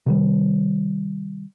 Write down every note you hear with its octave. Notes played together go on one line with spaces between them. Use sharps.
C3 D#3 G3